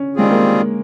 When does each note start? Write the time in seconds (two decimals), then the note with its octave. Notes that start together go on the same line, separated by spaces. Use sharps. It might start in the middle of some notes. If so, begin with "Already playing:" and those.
Already playing: C#4
0.16 D#3 G3 G#3 C4 F4 G#4
0.31 A#3